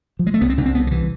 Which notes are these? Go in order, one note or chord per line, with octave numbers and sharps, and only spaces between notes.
F3
G#3
A3
C2 B3
C4
C2 D4
C4
C2 B3
D3
C3 E3